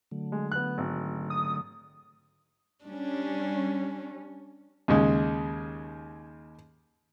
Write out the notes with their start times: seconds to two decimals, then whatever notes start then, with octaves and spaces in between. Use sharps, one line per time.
0.11 D3 F#3 A3
0.32 G#3
0.52 B3 F#6
0.78 G#1
1.30 D#6
2.85 G3 C#4 D4
4.88 D#2 C#3 G#3